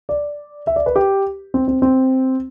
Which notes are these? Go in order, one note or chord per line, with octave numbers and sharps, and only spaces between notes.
D5
E5
D5
B4
G4
C4
C4
C4